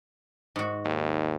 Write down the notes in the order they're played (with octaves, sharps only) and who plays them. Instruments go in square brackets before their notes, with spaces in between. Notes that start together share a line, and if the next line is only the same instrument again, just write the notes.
[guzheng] G#2 F#4
[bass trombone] D#2